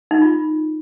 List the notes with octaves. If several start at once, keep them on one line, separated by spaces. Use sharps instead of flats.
D#4
F4